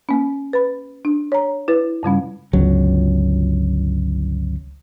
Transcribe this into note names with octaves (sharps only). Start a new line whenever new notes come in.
A#3 C#4
B4 B5
D4
C#5 A#5
E4 B4
G2 C#3 G3 C#4
G1 C#2 F#3